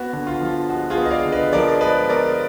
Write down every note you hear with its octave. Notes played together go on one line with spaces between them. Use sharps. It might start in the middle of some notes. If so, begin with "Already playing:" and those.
Already playing: B3 F#4
D3
F4
F3 F4
G#3 F#4
F4 G#4
B3
D#5
D5 F5
D3
B4 D#5
F3 A#4 D5
G#3 B4 D#5
B3 A#4 D5